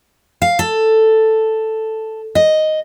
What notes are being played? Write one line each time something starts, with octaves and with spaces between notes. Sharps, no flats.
F5
A4
D#5